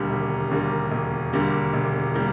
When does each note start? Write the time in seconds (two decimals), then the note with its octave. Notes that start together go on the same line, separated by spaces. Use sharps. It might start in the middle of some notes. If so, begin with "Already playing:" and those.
Already playing: E1 D#2 D3 G3 A#3
0.10 E1
0.51 D#2 D3 G3 A#3
0.92 E1
1.33 D#2 D3 G3 A#3
1.73 E1
2.14 G3 A#3